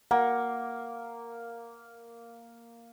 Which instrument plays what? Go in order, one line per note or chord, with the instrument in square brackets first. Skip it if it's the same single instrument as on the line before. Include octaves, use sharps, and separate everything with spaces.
[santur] A#3 [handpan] F#5